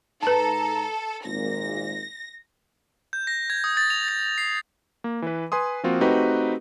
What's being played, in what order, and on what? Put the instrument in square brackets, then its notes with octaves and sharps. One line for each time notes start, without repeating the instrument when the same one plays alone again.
[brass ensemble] G#2 D#4 A#5 [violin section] A4 [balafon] B4 A5
[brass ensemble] G#1 A#2 [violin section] A#6
[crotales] G6
A#6
G#6
D#6
A6
F7
A6
C7
[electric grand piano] A#3
E3 B4
B4 G#5 C6 D#6
F3 A#3 C4 F4 F#4
A3 C4 D#4 F#4 G4 B4